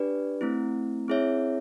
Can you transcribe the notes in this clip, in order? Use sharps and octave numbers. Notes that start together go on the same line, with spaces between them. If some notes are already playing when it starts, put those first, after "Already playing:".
Already playing: D4 G4 B4 D5
A3 C4 E4
C4 E4 G#4 C#5 E5